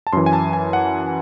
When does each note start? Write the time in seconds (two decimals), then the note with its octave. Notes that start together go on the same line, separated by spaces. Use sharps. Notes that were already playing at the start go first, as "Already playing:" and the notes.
0.07 A5
0.13 F#2 E3 C6
0.26 G#5
0.33 A5
0.53 G#5
0.73 F#5